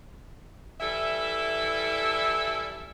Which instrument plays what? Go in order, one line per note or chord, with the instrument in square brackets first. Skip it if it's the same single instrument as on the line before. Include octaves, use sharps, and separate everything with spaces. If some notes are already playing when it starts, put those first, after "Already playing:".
[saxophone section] E3 G3 E4 A4 E5